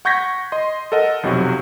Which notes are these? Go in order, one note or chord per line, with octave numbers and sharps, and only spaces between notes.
F#5 C#6 G6 G#6 A#6 B6
D#5 C6
A4 A#4 D#5 F#5
B1 F2 C3 F#3 F#4